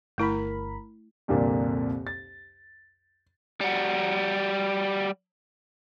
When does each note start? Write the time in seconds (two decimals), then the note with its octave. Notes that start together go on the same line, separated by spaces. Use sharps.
0.18 G1 A3 E4 A#4 B5
1.28 C2 F2 A#2 D3 A#3
2.07 A6
3.61 G3 F#4